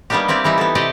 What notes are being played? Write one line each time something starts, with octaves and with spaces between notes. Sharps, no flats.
G3 A#3 B3 D4 D#4 G4
A#3 C4 E4 G4 D5
E3 G3 D#4 E4
B3 A4
C3 G4 D5 D#5 G5